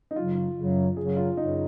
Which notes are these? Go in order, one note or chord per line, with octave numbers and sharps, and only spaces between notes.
D#4
F#2 C#3 F#3 F4
F#2 C#3 F#3
F#2 C#3 F#3 G#4
F4
F#2 C#3 F#3 D#4